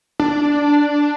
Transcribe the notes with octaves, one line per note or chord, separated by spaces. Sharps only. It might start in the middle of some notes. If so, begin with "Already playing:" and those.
D4